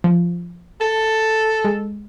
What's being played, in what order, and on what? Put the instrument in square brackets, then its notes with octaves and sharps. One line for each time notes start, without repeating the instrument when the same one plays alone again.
[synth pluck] F3
[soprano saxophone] A4 [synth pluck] A5
[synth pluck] G#3